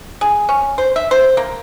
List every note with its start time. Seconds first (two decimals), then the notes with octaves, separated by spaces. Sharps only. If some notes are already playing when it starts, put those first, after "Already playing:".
0.21 G#4
0.49 C#4
0.78 C5
0.96 E5
1.11 C5
1.37 A#3